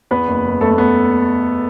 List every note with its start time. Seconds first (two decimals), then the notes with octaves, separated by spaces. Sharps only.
0.11 E2 B3 B4
0.27 F#1
0.44 F#1
0.61 F#1 A3 A4
0.78 B3